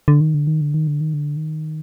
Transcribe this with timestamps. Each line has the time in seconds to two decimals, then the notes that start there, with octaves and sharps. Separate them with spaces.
0.08 D3
0.21 D#3
0.34 D3
0.47 D#3
0.61 D3
0.74 D#3
0.87 D3
1.01 D#3
1.14 D3
1.37 D#3